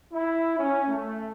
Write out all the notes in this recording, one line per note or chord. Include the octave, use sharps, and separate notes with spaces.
E4
C#4
A3